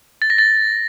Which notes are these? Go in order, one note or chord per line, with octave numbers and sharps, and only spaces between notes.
A6
A#6
A6